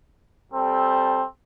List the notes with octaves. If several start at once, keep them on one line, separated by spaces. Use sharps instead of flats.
G3 C4 A4